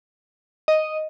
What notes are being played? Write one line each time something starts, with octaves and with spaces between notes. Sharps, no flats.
D#5